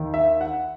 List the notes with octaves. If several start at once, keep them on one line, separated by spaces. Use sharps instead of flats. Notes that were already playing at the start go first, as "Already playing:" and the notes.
Already playing: D#2 D#3
E5
F#5